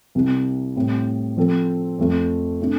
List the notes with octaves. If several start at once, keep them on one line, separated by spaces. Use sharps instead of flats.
C2 C3 G3
A2 G3 C4
F3 C4 A4
F2 F3 A3
C3 A3 D4